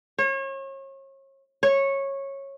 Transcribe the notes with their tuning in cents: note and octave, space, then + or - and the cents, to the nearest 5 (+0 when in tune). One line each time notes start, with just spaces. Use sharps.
C#5 -35
C#5 -15